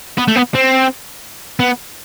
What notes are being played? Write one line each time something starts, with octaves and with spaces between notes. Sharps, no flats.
B3
A3
B3
C4
B3